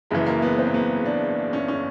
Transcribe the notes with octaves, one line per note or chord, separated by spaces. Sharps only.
F#1 F#2 C#3 E3 G#3
A#3
B3
C4
A#3
B3
D4
C#4
C#4